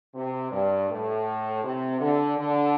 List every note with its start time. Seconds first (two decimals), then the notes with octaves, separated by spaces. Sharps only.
0.15 C3
0.52 G2
0.90 A2
1.64 C3
2.01 D3
2.38 D3